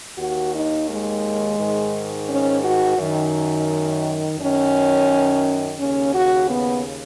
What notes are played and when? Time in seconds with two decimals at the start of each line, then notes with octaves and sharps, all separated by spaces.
0.17 D#2 D#3 F#4
0.53 D#4
0.87 G#3
1.57 G#2 D#3
2.27 C#4
2.62 F#4
2.98 F#2 D#3
4.38 F#2 D#3 C#4
5.78 D#2 C#3 C#4
6.14 F#4
6.49 B3